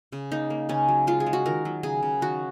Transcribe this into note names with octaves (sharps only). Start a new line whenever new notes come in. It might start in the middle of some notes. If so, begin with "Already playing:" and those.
C#3
A#3 D#4
A#3
C#3 C#4
F#3
G#3 F4
G#4
G#3
F#4
D#3 A#4
F#3
C#3 G#4
C#3
D#3 F#4